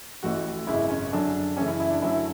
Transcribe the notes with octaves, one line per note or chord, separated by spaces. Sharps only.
A1 A2 E3 F#4
G#1 F#2 C#3 G#3 E4
C#4
F#2 D3 F#3 D4
F#2 C#3 E3 A3 C#4
E4
E4
D4
F#2 D3 F#3 A3 E4